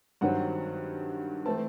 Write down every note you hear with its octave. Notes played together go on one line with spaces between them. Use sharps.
G2 D#3 F#3 C4 F#5
E3 A3 C4 A5